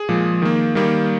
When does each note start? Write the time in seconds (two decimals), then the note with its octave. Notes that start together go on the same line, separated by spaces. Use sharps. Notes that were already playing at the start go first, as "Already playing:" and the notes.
Already playing: G#4
0.09 A#2 F3 G#3
0.42 D#3 A#3
0.75 D#3 G3 A#3